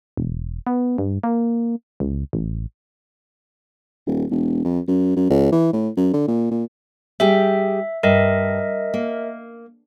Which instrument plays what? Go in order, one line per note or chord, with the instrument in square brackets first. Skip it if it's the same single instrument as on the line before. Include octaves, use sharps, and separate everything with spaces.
[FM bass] E1
B3
G2
A#3
C#2
A1
[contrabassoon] D#1
E1
F2
F#2
F#2
C#2
E3
A2
F#2
D3
A#2
A#2
[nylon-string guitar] G3 G4 G#4 [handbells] E5
[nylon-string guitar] G2 [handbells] A#4 D#5 E5
[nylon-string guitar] A#3